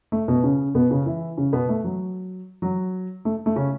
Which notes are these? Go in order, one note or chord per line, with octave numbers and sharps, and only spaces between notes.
A3
B2 B3
C#3 C#4
B2 B3
C#3 C#4
E3 E4
C#3 C#4
B2 B3
A3
F#3
F#3
A3
A3
C#3 C#4